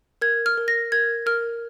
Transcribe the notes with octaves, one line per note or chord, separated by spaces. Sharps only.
A#4 G#6
F6
A#4
A#6
A#4 G#6
A#4 F6